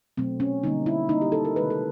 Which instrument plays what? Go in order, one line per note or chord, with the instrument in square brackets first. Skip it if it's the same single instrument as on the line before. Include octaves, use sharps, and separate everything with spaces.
[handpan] B2 F#3 A3 C4
C#4
D3 G3 A#3 D#4
E4
D#3 G3 A#3 D#4
G4
A4
A#4
C3 D#3 G#3 B4
A4